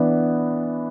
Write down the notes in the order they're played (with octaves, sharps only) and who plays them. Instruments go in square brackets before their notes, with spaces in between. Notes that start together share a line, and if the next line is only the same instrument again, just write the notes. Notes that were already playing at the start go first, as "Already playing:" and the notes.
Already playing: [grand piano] E3 B3 D4